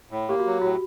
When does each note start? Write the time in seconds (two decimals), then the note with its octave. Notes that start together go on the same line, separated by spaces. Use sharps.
0.11 A2
0.29 A#3 G4
0.39 F#4
0.46 F#3
0.61 A2 F#4